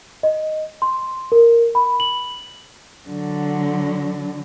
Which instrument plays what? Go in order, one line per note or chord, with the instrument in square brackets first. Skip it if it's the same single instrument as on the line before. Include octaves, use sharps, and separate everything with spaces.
[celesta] D#5
C6
A#4
B5
F#7
[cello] D3 F#3